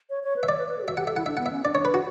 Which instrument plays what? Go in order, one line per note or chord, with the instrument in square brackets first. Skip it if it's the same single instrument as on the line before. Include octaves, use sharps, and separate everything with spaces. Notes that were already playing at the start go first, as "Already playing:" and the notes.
[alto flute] C#5
C#5
B4
[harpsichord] E5
[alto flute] C#5 [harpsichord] D5
[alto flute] B4
B4
A4
G4
[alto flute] F#4 [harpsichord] E5
[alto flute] G4 [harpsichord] F#5
[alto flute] A4 [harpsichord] E5
[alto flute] E4 [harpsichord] F#5
[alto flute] D4 [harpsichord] E5
[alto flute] B3 [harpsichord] F#5
[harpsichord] E5
[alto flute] C#4
[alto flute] D4 [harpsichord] D5
[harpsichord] C#5
B4
F#4